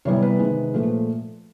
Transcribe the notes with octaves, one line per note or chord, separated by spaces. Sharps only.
C3 E3 G3 B3 C#5
B4
C3 D#3 G#3
A#2 F3 A3